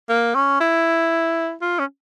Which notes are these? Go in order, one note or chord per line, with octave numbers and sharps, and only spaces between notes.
A#3
C#4
E4
F4
C#4